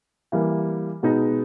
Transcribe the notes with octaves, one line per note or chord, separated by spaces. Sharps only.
E3 G3 A#3
B2 G#3 B3 D#4